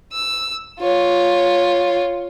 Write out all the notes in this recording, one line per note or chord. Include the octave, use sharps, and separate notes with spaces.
E6
F4 C#5